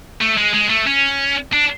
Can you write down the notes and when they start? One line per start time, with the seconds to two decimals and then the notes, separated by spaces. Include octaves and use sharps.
0.21 A3
0.37 G#3
0.54 G#3
0.70 A3
0.87 C#4
1.53 D4